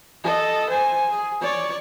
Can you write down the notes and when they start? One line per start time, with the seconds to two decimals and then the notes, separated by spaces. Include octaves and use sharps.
0.24 A4 D#5
0.70 C5 G#5
1.10 G#4
1.41 C#5 D5